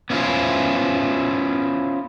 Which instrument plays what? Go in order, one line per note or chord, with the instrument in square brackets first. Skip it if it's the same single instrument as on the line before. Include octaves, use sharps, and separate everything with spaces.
[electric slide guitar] B3 C#4 E4 F4 C5